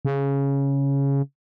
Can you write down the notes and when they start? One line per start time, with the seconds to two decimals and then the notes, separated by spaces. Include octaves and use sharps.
0.05 C#3